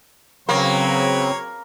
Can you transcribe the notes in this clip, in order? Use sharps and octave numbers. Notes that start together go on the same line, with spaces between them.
C#3 F#3 A#3 C4 B4 C#5